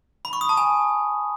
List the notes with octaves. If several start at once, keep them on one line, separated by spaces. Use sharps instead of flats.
B5
C#6
D#6
A5
G#5